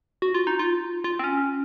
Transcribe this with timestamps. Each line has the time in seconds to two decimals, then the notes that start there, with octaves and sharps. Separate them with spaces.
0.22 F#4
0.34 F4
0.47 D#4
0.59 F4
1.04 F4
1.19 C4
1.24 C#4